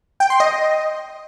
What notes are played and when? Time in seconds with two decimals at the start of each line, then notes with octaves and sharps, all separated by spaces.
0.20 G5
0.30 C6
0.40 D#5